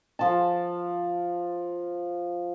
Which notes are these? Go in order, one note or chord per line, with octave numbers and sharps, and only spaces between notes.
F3 A5